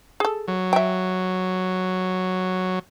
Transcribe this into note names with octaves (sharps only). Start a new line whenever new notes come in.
G#4 A4
F#3
E5 G5